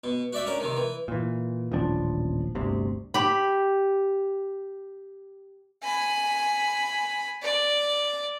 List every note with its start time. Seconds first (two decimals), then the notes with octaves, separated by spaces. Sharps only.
0.04 B2
0.33 F#4 D5 E5 G5
0.45 C#4 D4 A#4
0.60 C3 D#3
0.76 E3
1.08 A#2 E3
1.72 D#1 A1 F3 D4
2.55 G1 D2 C3
3.14 G4 B5
5.83 G#5 B5
7.43 D5